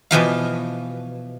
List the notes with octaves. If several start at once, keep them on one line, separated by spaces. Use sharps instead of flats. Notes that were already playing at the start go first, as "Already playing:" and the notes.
B2 E3 F3 F5